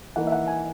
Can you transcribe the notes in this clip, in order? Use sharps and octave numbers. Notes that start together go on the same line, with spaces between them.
E3 A#3 D#4 F#5
E5
F#5
G#5